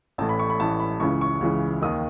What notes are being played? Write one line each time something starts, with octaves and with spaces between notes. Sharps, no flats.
A1 A2 E3 A5
B5
C#6
B5
A1 A2 E3 A5
B5
C#2 C#3 E3 C#6
C#6
C#2 C#3 E3
D#2 D#3 D#6